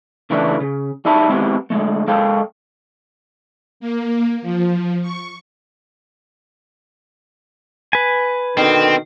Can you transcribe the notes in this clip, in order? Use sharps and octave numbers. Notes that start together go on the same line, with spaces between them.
C#3 E3 A3 D4 E4 B4
C#3
G3 D#4 E5 A5 B5
G#3 B3 C4 E4 G4
D3 G#3 A3
G#3 A4 F5 G5
A#3
F3
C#6
B4 G#5
B2 D3 D#3 C4